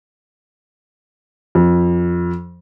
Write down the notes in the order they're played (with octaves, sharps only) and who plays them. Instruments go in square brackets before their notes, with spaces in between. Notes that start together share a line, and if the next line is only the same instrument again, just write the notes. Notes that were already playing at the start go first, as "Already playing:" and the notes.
[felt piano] F2